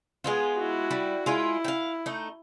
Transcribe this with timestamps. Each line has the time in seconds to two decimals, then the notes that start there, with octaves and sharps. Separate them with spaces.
0.24 G#3 B3 F4
0.56 E4 F#4
0.91 G3
1.26 G#3 E4 F4
1.64 F5 G5
2.06 A3 D#4